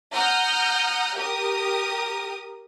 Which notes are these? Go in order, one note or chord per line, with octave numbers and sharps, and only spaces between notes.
F#5 A#5 D#6 F6 G6
G4 A#4 D#6